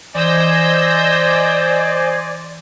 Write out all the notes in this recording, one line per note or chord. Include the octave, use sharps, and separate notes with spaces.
E3 C5 D5 D#5 G#5 E6 G6 A#6